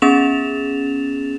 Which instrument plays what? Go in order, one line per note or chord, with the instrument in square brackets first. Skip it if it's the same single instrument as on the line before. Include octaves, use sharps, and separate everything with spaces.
[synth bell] B3 C#4 G#4 A6 E7 F7